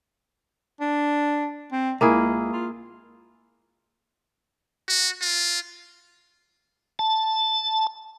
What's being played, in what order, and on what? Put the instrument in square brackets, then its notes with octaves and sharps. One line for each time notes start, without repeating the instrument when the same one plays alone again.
[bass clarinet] D4
C4
[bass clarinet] C#2 [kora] A#3 E4 G#4
[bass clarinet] F4
[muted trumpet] F#4
F4
[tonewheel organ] A5